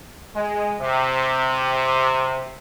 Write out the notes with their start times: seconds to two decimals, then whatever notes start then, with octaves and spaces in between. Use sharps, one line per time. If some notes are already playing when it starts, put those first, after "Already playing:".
0.36 G#3
0.81 C3